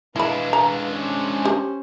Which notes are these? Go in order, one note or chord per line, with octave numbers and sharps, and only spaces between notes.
G#3 D4 E4 B4 F5 B5
A#5
C#4 C5
G4